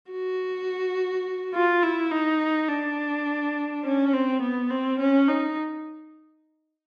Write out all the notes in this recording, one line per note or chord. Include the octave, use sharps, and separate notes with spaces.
F#4
F4
E4
D#4
D4
C#4
C4
B3
C4
C#4
D#4